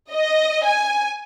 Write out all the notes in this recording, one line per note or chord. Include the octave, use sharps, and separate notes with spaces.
D#5
G#5